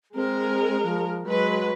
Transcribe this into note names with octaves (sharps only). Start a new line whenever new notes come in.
G#3 C4 A#4
F3
F#3 G#3 B4